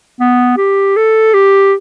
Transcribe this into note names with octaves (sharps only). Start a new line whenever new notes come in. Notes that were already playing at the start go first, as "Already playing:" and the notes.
B3
G4
A4
G4